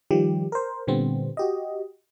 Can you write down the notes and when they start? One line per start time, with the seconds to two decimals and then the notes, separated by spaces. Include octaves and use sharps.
0.11 D#3 F3 G3 G4
0.52 A#4 C5
0.87 A#2 D3 G3 B3 C4
1.37 F#4 G4 D#5